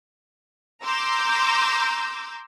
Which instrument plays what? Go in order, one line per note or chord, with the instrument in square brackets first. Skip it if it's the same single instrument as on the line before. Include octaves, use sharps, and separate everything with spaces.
[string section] A#5 C6 D6 E6 G6